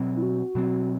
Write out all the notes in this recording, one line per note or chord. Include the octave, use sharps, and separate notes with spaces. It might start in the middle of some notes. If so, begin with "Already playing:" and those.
Already playing: B2 F#3 C4
E4
F#4
B2 F#3 C4